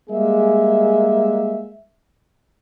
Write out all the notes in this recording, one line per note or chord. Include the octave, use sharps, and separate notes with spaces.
G3 G#3 A#3 G#4 E5